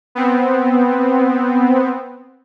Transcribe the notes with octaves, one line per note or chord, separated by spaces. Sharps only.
B3 C4